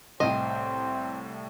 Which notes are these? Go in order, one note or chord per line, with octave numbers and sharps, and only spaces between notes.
C2 A2 C4 C5 D#5 G5